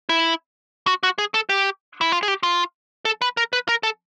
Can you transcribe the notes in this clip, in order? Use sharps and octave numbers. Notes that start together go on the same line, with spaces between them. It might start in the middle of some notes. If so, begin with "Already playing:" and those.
E4
F#4
F#4
G#4
A4
G4
E4
F4
G#4
G4
F4
A4
B4
A#4
B4
A#4
A4